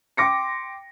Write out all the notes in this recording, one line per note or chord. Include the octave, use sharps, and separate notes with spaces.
G5 C6 D6 A#6 C#7